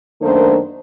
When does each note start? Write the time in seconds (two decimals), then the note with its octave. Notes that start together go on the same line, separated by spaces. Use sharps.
0.21 F#2 D#3 A3 A#3 D4 C5